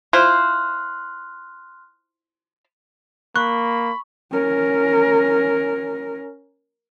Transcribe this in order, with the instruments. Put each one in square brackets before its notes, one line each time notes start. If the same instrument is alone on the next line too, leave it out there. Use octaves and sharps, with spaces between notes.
[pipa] E4 F4 C5 [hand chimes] C6 F6 F#6
[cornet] A#3 [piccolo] B5 [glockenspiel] C#6 [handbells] F#6
[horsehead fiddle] C#4 A#4